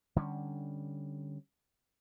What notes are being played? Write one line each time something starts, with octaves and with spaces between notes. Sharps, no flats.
D3 G3 G#3 C#4